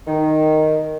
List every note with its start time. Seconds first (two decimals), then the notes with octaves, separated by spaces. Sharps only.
0.07 D#3